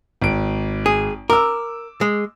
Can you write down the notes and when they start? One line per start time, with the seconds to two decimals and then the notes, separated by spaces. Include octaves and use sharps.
0.22 G#1 D7
0.86 G#4
1.30 A#4 D6 E6
2.01 G#3